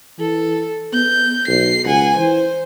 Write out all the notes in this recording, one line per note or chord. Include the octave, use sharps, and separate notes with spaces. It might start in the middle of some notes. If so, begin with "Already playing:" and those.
E3 A4
B3 G6
B1 C7
C#2 F#5 G#5
E3 C5